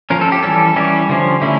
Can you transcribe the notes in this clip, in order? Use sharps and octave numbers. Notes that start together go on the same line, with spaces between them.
F3 C#4 A#4
A4
G4
E3 G3 C#4 A4
E3 G3 C#4 G4
D3 F3 C#4
D3 A3 C#4 E4